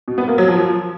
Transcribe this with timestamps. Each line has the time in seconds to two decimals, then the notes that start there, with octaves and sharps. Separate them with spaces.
0.08 B2
0.18 B3
0.28 A#3
0.38 F#3
0.48 F3